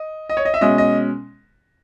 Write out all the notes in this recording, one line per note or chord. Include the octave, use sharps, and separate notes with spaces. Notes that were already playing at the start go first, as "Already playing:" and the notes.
Already playing: D#5
D#5
C#5
D#5
E5
B2 G#3 C#4 D#5
D#5